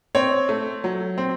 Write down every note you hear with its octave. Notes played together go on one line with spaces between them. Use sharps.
C4 C#5
A3
F#3
C4